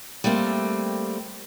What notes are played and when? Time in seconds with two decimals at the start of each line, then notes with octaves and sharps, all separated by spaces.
0.24 G3 A3 A#3 C4